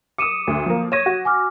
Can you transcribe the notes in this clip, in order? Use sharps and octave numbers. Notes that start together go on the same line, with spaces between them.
D6 D#6 C#7 D#7 E7
D2
F3 A#3
C#5 C#6 G#6 A#6 D#7 E7
F#4
G#5 D6 F6